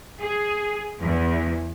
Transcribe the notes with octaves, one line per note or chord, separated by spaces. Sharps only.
G#4
E2